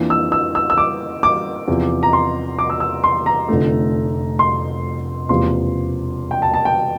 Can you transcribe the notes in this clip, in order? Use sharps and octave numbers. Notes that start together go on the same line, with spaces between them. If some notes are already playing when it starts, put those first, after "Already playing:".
Already playing: F2 E3 A#3 D4
E6
E6
E6
E6
D6
D6
E2 C3 F3
A#5
C6
D6
E6
E6
C6
A#5
F1 F2 D3 A3
C6
E1 E2 C3 F3 A#3 C6
G5
A5
A5
G5